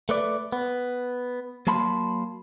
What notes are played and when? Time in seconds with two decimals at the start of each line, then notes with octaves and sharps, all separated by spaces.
0.09 A3 B4 D5
0.52 B3
1.67 F#3 A#3 A5 B5 C6